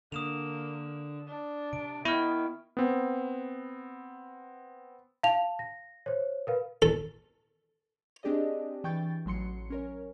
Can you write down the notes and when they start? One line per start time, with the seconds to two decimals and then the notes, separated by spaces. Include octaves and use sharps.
0.12 D3 A#3 D#6 E7 F7
1.27 D4
1.73 C3 D7
2.05 D#3 B3 E4 C#6 F6
2.77 B3 C4
5.23 F5 A5 F7
5.59 A#6
6.06 C5 C#5
6.47 A#4 B4 F5
6.82 A4
8.23 C4 D4 G4 G#4 D5 D#5
8.84 E3 G5 C#6 G6 A6
9.26 A1 F#3 C6 C#7
9.70 C#4 A#4 C#5